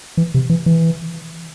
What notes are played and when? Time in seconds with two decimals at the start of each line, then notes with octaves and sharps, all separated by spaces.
0.17 E3
0.34 C3
0.50 E3
0.66 E3